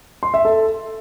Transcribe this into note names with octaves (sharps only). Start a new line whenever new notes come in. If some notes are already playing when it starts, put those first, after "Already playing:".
C6
E5
A4